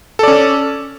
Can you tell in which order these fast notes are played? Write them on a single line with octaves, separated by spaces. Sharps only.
A4 D5 C#4